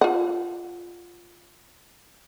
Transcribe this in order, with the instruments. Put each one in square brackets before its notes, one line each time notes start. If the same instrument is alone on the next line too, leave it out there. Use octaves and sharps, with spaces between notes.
[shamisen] F4 F#5